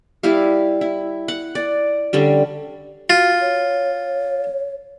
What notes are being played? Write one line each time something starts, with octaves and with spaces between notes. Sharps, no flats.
G3 E4 G4 F5
E4
F#5
D5
D3 G3 C#4
F4 F#4
C#5